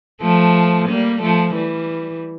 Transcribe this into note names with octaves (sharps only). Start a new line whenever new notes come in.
F3 A3
G3 A#3
F3 A3
E3 G3